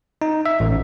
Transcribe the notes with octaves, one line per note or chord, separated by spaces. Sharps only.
D#4
E5
A1